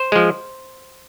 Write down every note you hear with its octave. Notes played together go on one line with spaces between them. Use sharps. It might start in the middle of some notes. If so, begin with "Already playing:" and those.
Already playing: C5
F3 G#3